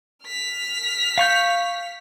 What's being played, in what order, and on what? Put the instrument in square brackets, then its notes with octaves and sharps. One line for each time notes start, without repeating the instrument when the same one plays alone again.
[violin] F6 B6
[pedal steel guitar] F5 C#6 G6